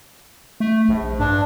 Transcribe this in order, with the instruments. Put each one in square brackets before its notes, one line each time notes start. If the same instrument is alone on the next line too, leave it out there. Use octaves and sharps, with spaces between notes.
[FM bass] A3
A#1
[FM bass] G2 [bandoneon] D4